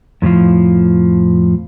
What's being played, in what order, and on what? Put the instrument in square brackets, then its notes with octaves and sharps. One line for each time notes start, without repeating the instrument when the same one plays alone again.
[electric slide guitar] F2 A2 E3 F3